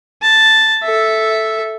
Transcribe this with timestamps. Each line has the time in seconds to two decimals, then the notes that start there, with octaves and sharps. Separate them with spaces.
0.22 A5
0.83 A4 E5